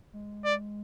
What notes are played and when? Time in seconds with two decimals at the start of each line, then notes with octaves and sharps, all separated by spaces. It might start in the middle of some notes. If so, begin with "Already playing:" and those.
0.13 G#3
0.45 D5